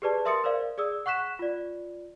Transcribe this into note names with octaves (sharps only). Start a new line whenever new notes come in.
G4 G#4 B4 D5 A5
A#4 E5 C6 D#6 A6 C#7
A#4 C5 D5 F5
G#4 D5 D#6 E6
F#5 C#6 F#6 B6 E7
F4 D5